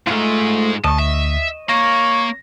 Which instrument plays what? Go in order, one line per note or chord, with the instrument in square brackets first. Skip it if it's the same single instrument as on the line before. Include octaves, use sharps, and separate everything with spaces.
[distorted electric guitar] G#2 G#3 [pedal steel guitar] A3 F4
[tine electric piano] D2 [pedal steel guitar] D#5 C#6 [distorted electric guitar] A5
[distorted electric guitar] E5
[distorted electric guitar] A#3 [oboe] C#5 [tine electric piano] A#6